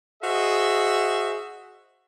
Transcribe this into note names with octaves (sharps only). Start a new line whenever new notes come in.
F#4 G#4 C5 D#5 E5